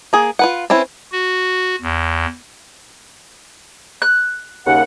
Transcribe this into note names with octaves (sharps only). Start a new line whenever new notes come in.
A#3 G#4
F4 B4 F#5
C4 C#4 E4 B4
F#4
E2
F#6
D#2 C#3 F#5